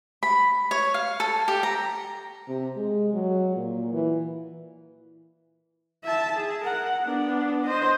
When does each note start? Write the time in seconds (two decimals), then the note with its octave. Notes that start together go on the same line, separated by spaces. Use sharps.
0.23 B5
0.71 C#5
0.94 F5
1.20 A4
1.48 G4
1.63 A#5
2.48 C3
2.77 G#3
3.14 F#3
3.56 A#2
3.93 E3
6.04 E5 A5
6.35 G#4
6.64 A#4 F#5
7.02 B3 D4
7.66 C5 D#5